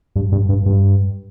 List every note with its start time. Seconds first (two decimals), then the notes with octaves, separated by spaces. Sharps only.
0.16 G2
0.32 G2
0.49 G2
0.66 G2